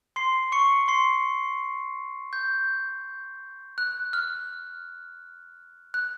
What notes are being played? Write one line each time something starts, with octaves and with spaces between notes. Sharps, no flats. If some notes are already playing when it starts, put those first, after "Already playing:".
C6 C7
C#6 C#7
C6 C7
G6
F#6
F6
F#6